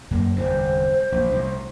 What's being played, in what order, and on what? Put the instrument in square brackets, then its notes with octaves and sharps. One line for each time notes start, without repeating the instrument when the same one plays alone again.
[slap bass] F#2 A#3
[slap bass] G1 E2 C3 [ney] C5
[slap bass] A#1
C2 A2